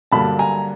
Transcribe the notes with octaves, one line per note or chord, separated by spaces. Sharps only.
G2 D3 F#3 A#3 A5 B5
G#5 A#5